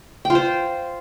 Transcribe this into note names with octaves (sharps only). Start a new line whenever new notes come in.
G5
F4
C5